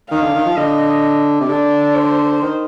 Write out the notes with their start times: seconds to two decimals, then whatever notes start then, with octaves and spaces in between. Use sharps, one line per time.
0.10 D#3 F5
0.22 D3
0.35 D#3
0.46 F3
0.57 D3 D#5
1.41 C3
1.49 D3 D5
1.95 C5
2.42 D#3